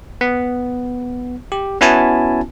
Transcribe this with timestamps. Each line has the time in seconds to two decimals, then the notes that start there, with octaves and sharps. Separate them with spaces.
0.21 B3
1.52 G4
1.81 B3 C#4 E4 F#4 G#5 A5